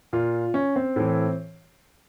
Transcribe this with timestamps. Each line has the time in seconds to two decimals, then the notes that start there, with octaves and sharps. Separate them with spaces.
0.13 A#2 F4
0.54 C#4
0.76 C4
0.96 A2 E3